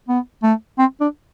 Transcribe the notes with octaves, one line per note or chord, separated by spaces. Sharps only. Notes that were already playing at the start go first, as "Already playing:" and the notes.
B3
A3
C4
D4